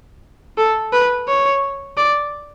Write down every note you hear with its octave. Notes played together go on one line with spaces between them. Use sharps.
A4
B4
C#5
D5